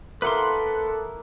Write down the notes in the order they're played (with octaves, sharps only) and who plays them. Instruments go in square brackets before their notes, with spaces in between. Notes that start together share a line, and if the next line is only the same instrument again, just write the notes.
[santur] A#3 B3 E4 [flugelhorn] A4 [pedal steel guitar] B4 F#5 C6